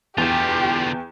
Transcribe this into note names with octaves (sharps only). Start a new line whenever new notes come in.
E2 D3 F4 G4 G5